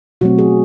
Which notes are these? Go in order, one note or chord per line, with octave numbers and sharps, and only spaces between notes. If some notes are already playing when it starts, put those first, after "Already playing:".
B2 F#3 A3 C4 F#4
G#4